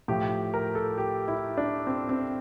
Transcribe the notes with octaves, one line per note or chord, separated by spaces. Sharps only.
A2 F3 G4
A#4
A4
G4
E4
D4
C4
C4